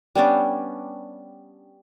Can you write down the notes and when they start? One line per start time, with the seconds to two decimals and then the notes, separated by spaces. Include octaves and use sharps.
0.15 G3 B3 C#4 D4